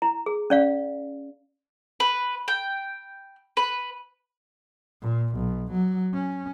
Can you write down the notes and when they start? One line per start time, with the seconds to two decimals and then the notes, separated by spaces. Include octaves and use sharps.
0.02 E4 A#5
0.26 G#4
0.50 C#4 D5 F5
2.00 B4
2.48 G5
3.57 B4
5.02 A#2
5.36 B1
5.72 F#3
6.14 C#4